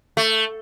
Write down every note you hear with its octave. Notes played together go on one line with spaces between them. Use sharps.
A3